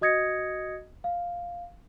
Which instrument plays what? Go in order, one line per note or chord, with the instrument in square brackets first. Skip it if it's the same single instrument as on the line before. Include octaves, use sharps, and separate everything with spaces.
[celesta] F#4 D#5 D#6 G#6 A#6 C#7
F5